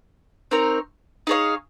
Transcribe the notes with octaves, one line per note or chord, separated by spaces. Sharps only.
C4 D#4 A#4 C#5
D#4 G#4 C#5 F5